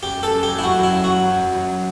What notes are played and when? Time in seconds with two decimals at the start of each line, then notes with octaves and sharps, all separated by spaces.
0.03 F#2 G4
0.17 F#2
0.23 A4
0.34 F#2
0.43 F#3 G4
0.58 E4
0.64 F#2 F#4
0.79 F#3 E4
0.93 F#2
1.04 F#2 F#4
1.24 F#3
1.40 F#2
1.55 F#3